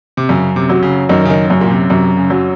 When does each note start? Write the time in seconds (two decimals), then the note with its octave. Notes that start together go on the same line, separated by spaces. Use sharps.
0.17 C3
0.29 F#2 C#3
0.56 C3
0.70 F#3
0.83 C#3
1.09 F#2 D#3
1.25 C#3
1.30 D#3
1.50 F#2 C#3
1.61 A#2
1.70 C3
1.90 F#2 C3
2.17 C#3
2.30 F#3